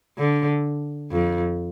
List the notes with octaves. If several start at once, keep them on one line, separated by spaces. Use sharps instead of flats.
D3
F2